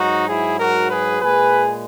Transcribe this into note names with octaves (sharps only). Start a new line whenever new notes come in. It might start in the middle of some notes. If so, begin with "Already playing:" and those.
Already playing: G#2 F#3 D#4 F#4
E4 G#4
F#4 A#4
G#4 B4
A#2 G#3 G#4 B4